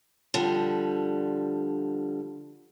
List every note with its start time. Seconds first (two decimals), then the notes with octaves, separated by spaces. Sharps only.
0.34 D3 F3 G3